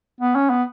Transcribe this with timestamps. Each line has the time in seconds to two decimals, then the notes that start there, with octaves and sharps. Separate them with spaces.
0.21 B3
0.35 C#4
0.50 B3